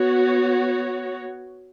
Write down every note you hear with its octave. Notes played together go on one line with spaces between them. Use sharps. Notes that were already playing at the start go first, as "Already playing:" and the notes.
Already playing: B3 F#4 C#5